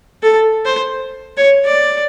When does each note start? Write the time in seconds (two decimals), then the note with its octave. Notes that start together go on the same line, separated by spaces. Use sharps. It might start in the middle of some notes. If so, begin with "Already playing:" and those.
0.23 A4
0.65 C5
1.37 C#5
1.65 D5